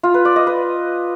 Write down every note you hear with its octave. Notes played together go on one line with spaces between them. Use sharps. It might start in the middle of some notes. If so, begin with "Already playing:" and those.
F4
B4
D5
D#5
B4